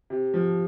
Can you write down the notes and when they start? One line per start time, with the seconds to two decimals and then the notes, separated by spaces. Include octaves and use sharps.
0.10 C3
0.34 F3